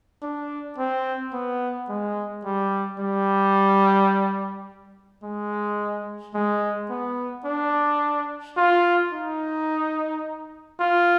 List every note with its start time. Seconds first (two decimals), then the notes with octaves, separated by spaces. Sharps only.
0.23 D4
0.78 C4
1.33 B3
1.89 G#3
2.45 G3
3.00 G3
5.23 G#3
6.34 G#3
6.90 B3
7.45 D4
8.57 F4
9.13 D#4
10.80 F4